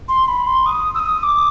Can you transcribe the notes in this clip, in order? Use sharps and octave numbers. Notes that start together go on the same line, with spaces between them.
C6
B5
C6
D#6
E6
D#6
D6